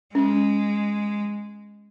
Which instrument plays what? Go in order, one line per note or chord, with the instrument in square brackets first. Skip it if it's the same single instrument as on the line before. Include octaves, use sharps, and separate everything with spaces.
[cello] G#3 [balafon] C#4